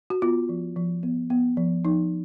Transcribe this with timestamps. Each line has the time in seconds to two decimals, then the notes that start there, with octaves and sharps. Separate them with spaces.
0.10 F#4
0.22 B3 F4
0.49 F3
0.76 F3
1.03 B3
1.30 B3
1.57 F3
1.85 F3 D#4